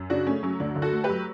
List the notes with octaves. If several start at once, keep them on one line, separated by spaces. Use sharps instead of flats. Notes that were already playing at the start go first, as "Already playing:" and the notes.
Already playing: F#2
C#3 D4 F#4
A3 C#4
F#3 C#4
D2 D4
D3
F#4 A4
A3
G4 B4
F#3